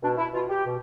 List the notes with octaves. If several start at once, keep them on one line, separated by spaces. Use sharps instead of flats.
B2 D4
E4
B2 F4
G4
B2